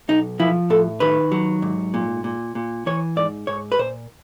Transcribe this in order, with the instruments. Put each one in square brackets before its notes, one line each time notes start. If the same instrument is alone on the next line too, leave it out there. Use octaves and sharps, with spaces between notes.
[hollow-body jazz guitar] B1 D#4
F3 E4
A2 A4
D#3 B4
F#3
G#2
A#2
A#2
A#2
E3 C#5
G#2 D5
G#2 C#5
B4
A#2 C5